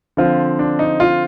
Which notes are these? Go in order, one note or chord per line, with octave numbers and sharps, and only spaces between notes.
D3 F3 C4 F4
D4
D#4
F4